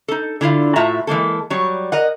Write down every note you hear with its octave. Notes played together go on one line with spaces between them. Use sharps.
D#4 A4
D3 E4 F4 F5
A2 F4 F#4 E5 A5 A#5
E3 G#3 A#3 A4
F#3 G3 C#5
A#4 D#5 F#5